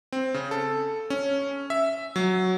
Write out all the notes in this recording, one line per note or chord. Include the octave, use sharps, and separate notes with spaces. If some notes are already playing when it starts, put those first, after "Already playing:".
C4
C#3
A4
C#4
E5
F#3